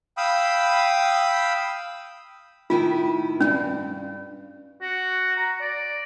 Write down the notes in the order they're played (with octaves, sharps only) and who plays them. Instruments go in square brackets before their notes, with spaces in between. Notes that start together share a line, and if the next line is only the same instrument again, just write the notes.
[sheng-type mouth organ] F5 G5 B5 D#6 E6
[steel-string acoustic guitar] A2 D#3 E4 [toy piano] F4
[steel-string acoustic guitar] E2 G2 [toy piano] C#4
[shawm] F#4
A#5
D5